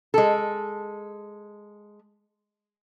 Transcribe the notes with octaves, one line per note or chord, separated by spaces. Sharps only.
G#3 A4